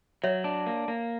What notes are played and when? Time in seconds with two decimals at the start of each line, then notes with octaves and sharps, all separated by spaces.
0.23 F#3 C#5 E5
0.44 D4
0.66 A#3
0.88 A#3